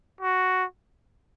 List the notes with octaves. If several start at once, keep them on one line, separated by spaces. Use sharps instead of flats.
F#4